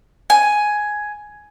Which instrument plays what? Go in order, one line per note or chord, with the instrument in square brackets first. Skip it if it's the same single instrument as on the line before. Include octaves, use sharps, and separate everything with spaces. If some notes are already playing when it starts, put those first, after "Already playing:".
[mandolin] G#5